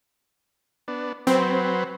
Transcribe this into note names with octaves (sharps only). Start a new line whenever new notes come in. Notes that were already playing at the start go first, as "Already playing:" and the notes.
B3 D4
F#3 C4 B4 C5